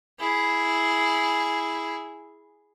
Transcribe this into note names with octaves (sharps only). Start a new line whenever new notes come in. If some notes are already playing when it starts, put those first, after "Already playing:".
E4 G#4